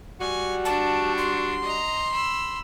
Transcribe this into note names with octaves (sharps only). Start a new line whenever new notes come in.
G3 F#4 G#5
D4 A5
C6
D#5 A#5
B5 E6